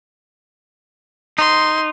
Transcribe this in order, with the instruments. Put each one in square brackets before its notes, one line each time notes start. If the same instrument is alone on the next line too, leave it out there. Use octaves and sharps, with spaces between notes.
[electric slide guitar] D#4 [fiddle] C6